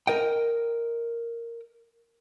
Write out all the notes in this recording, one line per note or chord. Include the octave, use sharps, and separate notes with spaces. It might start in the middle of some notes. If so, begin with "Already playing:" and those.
A#4 D#5 G5